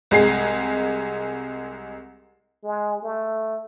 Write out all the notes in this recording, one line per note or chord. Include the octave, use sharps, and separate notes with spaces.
C2 G#3 G#4 C7
G#3
A3